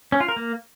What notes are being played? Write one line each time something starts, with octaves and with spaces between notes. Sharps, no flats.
C#4
F4
A#4
A#3